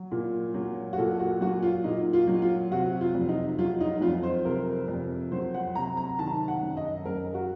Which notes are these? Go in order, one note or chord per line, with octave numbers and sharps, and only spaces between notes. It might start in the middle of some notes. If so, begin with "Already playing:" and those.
Already playing: F#3
A#2
F#3
F#4
A#2 A4
F#4
F#3 F#4
F4
A#2 D#4
F4
F#3
F4
C3 F#4
F4
F2
D#4
F#3 F4
D#4
F2 F4
C5
C3 A#4
F2
F#3 C5
F#5
C3 A#5
A#5
D#3 A5
F#5
F#2
D#5
F#2 A#4
F#4